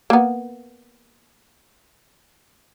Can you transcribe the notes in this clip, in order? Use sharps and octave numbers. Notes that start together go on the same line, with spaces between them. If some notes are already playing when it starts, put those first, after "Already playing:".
A#3 B3